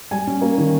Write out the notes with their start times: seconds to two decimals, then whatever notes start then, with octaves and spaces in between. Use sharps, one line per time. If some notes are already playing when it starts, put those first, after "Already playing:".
0.11 G3 G#5
0.27 C#4
0.42 A#3
0.58 D#3